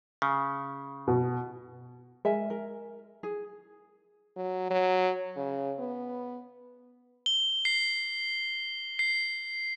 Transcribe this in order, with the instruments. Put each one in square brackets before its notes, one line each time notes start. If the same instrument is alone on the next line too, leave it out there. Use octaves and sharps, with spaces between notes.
[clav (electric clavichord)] C#3
[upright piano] B2
[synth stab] G#3 [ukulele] A#4 E5 G#5
[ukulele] A#4
G#4
[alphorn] F#3
F#3
C#3
B3
[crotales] G7
C7
C7